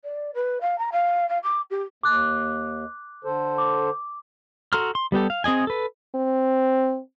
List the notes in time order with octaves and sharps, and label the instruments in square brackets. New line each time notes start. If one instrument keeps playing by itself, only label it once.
[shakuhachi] D5
B4
F5
A#5
F5
F5
D6
G4
[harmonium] D#2 [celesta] D6 F#6
[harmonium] D3 A4 C5
[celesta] D6
[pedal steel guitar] F#4 A4 A#5 C6 F6
C6
G3 B3 G4 A4
F5
C4 G#4 D#5 G#5
A4 B4
[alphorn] C4